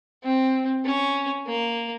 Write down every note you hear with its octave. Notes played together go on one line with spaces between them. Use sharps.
C4
C#4
A#3